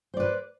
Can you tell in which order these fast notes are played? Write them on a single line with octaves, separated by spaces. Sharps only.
C5 D5 B4